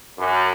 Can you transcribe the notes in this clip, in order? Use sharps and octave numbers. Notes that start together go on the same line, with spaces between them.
F#2